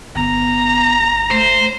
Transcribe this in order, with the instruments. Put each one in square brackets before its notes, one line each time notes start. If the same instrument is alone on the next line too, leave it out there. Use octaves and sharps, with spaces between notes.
[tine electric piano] G1 [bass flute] B3 [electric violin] A#5
[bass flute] A3 [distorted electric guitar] C5